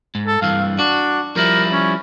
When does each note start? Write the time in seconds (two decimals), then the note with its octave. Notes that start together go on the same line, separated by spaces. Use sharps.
0.15 G#2
0.27 A4
0.42 G2 E3 F5
0.79 D4 F#4
1.36 F3 G3 E4 A#4
1.73 C#4